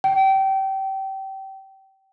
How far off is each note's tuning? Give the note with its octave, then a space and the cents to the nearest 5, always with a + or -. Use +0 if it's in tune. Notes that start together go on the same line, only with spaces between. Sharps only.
G5 -25